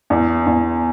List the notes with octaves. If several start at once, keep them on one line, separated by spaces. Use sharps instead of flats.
E2
E2